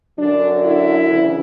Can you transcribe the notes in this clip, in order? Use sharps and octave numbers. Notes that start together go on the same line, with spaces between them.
F#2 D3 F#3 D4
E4
D2 C#3 E3